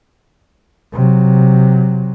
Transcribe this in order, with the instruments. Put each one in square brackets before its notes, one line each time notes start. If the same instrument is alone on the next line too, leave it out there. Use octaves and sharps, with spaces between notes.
[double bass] C3 F#3